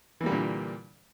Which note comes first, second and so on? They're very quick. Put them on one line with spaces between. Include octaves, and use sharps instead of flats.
E3 A#3 G3 D3 A#2